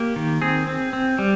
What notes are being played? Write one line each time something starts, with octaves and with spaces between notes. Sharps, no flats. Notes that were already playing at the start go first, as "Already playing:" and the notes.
Already playing: A#3 G4
D#3
C4 G#4
C4
C4
G3